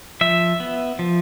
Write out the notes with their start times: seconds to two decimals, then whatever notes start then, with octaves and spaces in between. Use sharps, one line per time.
0.21 F3 E5
0.60 B3
0.99 F3